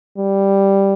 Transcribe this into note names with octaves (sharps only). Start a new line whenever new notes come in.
G3